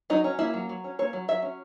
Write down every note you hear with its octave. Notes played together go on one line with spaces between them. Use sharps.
F#3 D#4
C#4
A#3 E4
F#3
F#3
C#4
A#3 C#5
F#3
F#3 E5
C#4